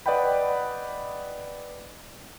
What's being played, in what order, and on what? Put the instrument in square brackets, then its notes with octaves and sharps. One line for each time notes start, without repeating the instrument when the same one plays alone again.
[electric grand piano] B4 D5 D#5 F#5 G5 B5